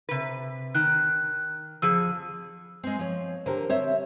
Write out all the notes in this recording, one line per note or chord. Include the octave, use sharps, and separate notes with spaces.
C3 B4
D#3 F#6
F2 F3 G#4 E6
G#3 C4
F3 C#5
D3 G4 A#4 C5
C4 C5 C#5 E5